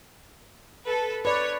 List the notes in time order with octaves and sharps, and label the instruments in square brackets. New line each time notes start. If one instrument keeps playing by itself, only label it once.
[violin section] A4 B4
[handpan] B4 D5 [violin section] C#5